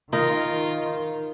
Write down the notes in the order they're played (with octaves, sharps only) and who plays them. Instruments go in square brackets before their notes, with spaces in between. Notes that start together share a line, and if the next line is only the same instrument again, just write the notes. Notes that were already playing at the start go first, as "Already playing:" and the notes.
[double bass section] D#3 [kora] D#4 A#4 [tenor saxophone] F4